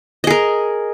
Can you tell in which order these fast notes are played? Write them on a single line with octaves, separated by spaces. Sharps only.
D#5 G#4 A#4